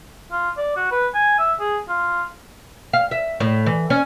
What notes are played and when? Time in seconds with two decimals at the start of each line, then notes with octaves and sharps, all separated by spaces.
0.32 F4
0.57 D5
0.77 F#4
0.91 B4
1.14 G#5
1.39 E5
1.60 G#4
1.89 F4
2.93 F5
3.11 E5
3.40 A2
3.66 E3
3.90 C#4